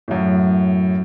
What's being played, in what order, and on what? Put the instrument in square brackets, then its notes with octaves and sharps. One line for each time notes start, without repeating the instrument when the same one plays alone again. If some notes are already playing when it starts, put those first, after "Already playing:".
[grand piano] F#2 A2